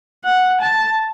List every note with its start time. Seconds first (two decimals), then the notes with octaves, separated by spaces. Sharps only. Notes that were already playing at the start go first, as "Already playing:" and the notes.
0.25 F#5
0.61 A5